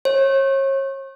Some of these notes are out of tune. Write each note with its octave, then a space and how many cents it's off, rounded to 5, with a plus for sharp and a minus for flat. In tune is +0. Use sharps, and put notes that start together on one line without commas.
C#5 -35